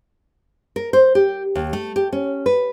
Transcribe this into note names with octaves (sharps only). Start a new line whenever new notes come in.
A#4
C5
G4
D#2
A3
G4
C#4
B4